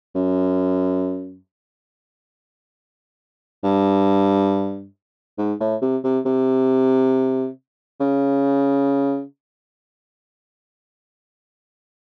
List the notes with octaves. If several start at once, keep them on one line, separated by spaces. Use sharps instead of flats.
F#2
G2
G#2
A2
C3
C3
C3
C#3